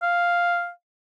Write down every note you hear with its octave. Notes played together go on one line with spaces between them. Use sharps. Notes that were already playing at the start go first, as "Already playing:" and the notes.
F5